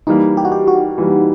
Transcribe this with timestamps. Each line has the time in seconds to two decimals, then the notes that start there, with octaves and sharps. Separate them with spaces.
0.07 E3 G3 A#3 D#4
0.37 G4
0.45 F#4
0.52 G4
0.68 F#4
0.98 E3 G3 A#3